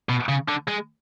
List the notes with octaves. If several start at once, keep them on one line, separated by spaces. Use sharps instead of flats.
B2
C#3
D3
G#3